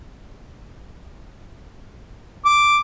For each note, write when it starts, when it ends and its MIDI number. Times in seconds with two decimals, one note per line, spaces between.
2.45 2.78 86